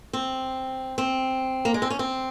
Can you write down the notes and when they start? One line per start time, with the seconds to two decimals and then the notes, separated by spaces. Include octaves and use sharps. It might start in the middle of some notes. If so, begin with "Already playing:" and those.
0.13 C4
0.98 C4
1.65 A#3
1.74 G#3
1.82 C4
1.90 C#4
1.99 C4